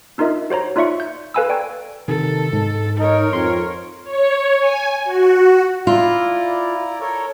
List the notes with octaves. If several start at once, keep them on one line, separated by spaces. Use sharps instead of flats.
D4 D#4 F4 A#4 D#5 E5
F#4 C5 C#5 A#5
D#4 F4 D5 E5 C#6 C#7
G6
A4 B4 F5 G#5 B5 E6
D5 G5 A#5 C#6 G#6
C3 D#3 A4
G#2
D#4 A#4 C#5
F2 C6
C#5
G#5
F#4
E4 F4 D5 A#5
A4 A#4 C#5